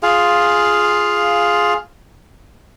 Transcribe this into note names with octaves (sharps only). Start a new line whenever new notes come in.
F4 G#4 F5